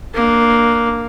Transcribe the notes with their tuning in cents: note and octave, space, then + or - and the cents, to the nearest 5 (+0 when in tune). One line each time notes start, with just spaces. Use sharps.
A#3 +0 D4 +15